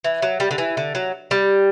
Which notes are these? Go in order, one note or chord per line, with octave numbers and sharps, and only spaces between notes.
E3
F#3
G3
D3
E3
D3
F#3
G3